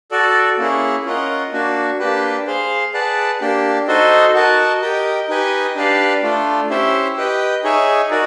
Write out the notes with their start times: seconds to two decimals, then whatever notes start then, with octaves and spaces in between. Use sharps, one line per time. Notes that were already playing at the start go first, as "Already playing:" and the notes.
0.11 F#4 A4 D5
0.58 A#3 C#4 E4 G#4
1.05 C#4 F4 A#4 D#5 F#5
1.52 A#3 D4 F#4
1.99 A#3 D4 G4 B4
2.47 G#4 C5 F5
2.93 G#4 B4 D5 F#5 A5
3.40 A#3 D4 G4
3.87 D#4 F#4 A4 C5 D#5
4.35 F#4 A#4 D#5 F#5 A5
4.82 G4 A#4 D#5 G5
5.29 D#4 G4 B4 D#5 G#5
5.76 D4 G4 B4 D5 F5
6.23 A3 D4 F4
6.70 C#4 E4 G4 C5 E5
7.17 G4 B4 D#5 G5
7.64 D#4 G#4 C#5 E5 G#5
8.11 D#4 F#4 A#4 D5